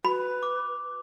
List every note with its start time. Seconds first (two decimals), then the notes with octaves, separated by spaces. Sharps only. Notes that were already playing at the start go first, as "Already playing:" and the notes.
0.05 F#4 B4 B5
0.43 D6